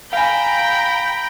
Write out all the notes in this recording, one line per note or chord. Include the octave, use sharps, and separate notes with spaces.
F5 G5 G#5 A#5 B5